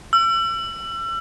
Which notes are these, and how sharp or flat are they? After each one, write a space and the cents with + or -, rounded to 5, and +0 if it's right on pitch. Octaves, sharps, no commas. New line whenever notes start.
E6 +35